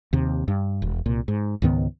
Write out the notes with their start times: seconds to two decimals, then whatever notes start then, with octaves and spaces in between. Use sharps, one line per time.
0.13 D#2 C3
0.48 G2
0.82 E1
1.06 C2 A#2
1.28 G#2
1.62 C#2 G#2 D#3 B3